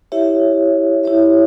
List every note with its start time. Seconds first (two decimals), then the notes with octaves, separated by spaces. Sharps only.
0.12 E4 G4 C#5 E5
1.04 E4 G4 C#5 E5